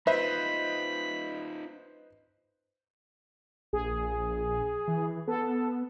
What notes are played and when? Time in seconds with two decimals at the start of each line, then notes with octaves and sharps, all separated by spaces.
0.07 D#4 F4 B4 C5 D#5 E5 B5
3.73 A#1 G#4
4.88 E3
5.28 B3 A4